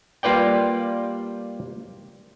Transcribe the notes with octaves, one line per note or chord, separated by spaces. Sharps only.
G3 A#3 F4 B4 D5 G5